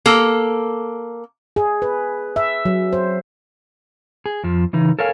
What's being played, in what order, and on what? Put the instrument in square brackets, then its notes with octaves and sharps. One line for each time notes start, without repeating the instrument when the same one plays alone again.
[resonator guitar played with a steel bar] A#3 A4
[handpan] G#4
B4
E5
F#3
C5
[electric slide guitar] G#4
F2 F3
C#3 E3 D#4
A4 A#4 C#5 F5 G#5